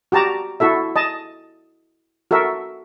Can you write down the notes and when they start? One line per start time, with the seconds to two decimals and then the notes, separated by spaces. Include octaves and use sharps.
0.12 F#4 G4 A5 A#5
0.60 E4 F#4 A4 E5
0.96 D#5 A5
2.31 F#4 A4 A#4 E5